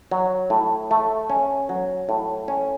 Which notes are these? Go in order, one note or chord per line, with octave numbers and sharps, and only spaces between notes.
F#3
A2
A3
C#4
F#3
A2
C#4